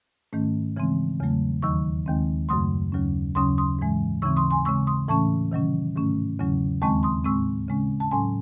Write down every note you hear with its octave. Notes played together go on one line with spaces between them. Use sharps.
G#2 D#3 A3 C#4
C#3 E3 G#3 C4
E2 C#3 F#3 A3
D#2 D#3 F#3 C#6 E6
D#2 D#3 G#3 C4
F#2 C#3 F#3 A3 C6 D#6
D#2 C#3 F#3 C#4
D#2 C#3 F#3 C#4 C6 D#6
C6 D#6
G#2 E3 G#3
D#2 C#3 E3 C4 C#6 E6
C6 D#6
G#5 C6
C#3 G#3 C4 C#6 E6
C6 D#6
A2 E3 A3 C#4 A5 C#6
C3 D#3 F#3 C#4
G#2 D#3 A3 C#4
E2 C#3 F#3 C#4
D#2 D#3 G#3 C4 A5 C#6
C6 D#6
A2 G#3 C4 C#6 E6
C#3 G#3 C#4
A5
A2 F#3 C#4 G#5 C6